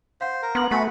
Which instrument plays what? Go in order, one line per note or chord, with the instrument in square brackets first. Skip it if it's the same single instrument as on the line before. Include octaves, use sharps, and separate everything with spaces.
[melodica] C5 [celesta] F5 F#5
[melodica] A#4
[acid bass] B3 [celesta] C6 F6 F#7
[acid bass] A3 [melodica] F#4 B4 B5 [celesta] F#5 G#5 C#7